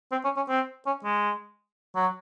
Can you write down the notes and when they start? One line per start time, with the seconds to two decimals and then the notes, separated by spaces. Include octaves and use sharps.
0.12 C4
0.24 C#4
0.37 C#4
0.49 C4
0.86 C#4
1.04 G#3
1.96 F#3